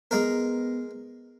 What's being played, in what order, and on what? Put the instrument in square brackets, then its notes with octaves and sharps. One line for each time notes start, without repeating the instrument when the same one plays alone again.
[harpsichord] G#3 A#4 [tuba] B3